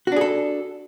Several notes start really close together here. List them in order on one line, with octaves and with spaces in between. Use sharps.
F#4 D4 G#4 A4